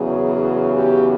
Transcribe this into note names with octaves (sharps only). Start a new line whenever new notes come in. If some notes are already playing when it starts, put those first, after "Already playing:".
Already playing: E2 C#3 F#3 G#4
G4